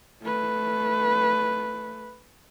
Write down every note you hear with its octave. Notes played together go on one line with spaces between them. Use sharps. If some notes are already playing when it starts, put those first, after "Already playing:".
A3 B4